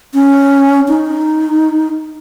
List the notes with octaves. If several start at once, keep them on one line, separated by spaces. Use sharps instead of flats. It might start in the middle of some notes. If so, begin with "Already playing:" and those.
C#4
D#4